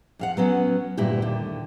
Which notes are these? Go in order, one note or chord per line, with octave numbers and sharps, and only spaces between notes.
F2 F5 F#5
F#3 B3 C#4
D2 G2 A#2 E4 G4
D#2 D3